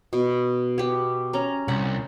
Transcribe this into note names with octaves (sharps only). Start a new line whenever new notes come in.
B2
B3 G4
C#4 A#5
C2 F#5